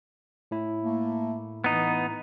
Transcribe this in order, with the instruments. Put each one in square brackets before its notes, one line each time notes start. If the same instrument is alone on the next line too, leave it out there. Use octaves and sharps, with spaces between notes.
[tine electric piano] A2 E4
[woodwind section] A3 A#3
[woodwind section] E3 [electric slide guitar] B3 D#4